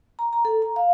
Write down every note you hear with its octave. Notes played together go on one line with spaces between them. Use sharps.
A#5
A#5
A4
A#5
F5